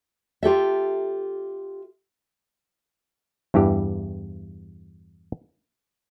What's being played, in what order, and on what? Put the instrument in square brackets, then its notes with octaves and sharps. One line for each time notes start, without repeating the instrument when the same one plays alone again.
[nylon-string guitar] F4 G4 A4 E5
[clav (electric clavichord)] E2 G2 E3 G4